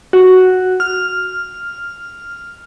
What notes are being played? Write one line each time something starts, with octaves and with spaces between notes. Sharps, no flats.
F#4
F6